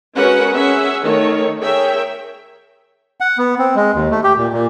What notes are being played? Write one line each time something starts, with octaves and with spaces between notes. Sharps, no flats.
G#3 C#4 F#4 A#4 B4 F#5
C#4 G#4 E5 F#5
D#3 A3 C#5
G#4 A#4 C#5 E5 G5
F#5
B3
C4
G#3
D#2
A3
G4
A#2
A#2